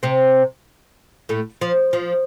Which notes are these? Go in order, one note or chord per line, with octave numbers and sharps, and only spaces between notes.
C3 C4
A2 A3
F3
F3